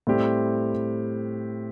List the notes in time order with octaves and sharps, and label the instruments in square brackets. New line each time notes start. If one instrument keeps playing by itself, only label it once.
[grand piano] A2 G3 C4 G4